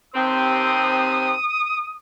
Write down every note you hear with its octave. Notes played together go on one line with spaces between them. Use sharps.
D#2 C3 C4 D#6